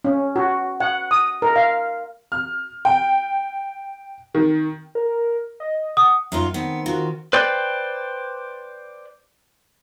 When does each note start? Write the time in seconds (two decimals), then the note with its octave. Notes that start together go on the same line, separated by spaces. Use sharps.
0.04 C#4
0.36 F#4
0.80 F#5
1.11 D#6
1.42 A#4
1.56 F5
2.32 F6
2.85 G5
4.35 D#3
4.95 A#4
5.60 D#5
5.97 F#5 D#6
6.32 F#2 D#4 F4
6.54 D#3 B3 C4
6.86 D#3 F4 F#4
7.33 B4 C5 D5 G5